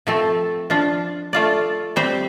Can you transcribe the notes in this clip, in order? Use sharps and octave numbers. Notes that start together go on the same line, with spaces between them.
F3 A3 C4 A4
F3 D4 F4
A3 F4 D5
G3 C4 G4 C5